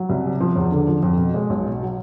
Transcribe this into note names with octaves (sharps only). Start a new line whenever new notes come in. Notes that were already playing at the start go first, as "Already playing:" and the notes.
Already playing: F#3
C2
C3
F3
E2
D3
F3
F2
B2
G#3
B1
B2
F#3